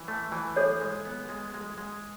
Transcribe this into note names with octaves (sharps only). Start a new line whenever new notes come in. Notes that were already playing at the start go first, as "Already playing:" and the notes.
Already playing: E3
A3
E3
G#4 A4 C#5
G#3
B3
G#3
G#3
G#3